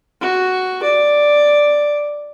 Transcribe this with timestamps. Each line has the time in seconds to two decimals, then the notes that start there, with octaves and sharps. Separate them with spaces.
0.21 F#4
0.83 D5